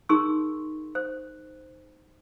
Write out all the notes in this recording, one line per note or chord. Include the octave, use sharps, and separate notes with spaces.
D#4 G#4 A#4 C6 C#6 E6
C5